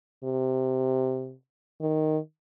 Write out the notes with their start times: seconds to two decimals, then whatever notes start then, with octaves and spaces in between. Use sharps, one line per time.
0.24 C3
1.81 D#3